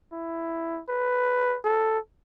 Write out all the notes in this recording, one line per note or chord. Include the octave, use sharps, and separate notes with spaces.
E4
B4
A4